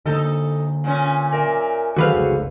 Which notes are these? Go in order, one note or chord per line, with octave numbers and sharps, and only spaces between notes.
D3 A#3 D#4 A4
A#2 C#4
A#4 D5 E5
D3 D#3 F#3 F#4 G#4 B4 C5 F5
F1 C#2